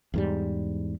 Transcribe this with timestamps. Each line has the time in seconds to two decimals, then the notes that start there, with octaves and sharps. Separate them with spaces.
0.14 E2 G#2 G3